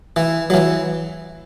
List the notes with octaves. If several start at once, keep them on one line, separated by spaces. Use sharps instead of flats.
E3
F#3
E3